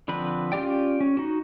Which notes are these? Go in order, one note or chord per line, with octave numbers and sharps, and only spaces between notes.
D3 F3 C4 B4 B5
C#4 F4 G4 D5 G5
C#4
D#4 F#4